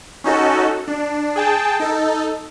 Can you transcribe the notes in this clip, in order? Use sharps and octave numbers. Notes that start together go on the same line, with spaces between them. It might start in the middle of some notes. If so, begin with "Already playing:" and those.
C#4 D#4 F#4 A4
D4
G#4 G5 A5
D#4 A4